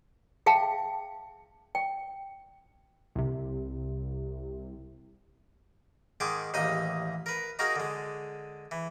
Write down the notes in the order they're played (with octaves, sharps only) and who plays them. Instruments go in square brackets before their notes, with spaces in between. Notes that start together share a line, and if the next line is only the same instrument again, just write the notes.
[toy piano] G#4 E5 F5 G5 A5
G5
[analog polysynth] C2 C3
[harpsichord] G#2 D#3 G#5 C6 D6
A1 D#2 D#4 D#5 D#6
A#4 B4
D#4 F#4 G#4 A#4 F5
D3 G#3
E3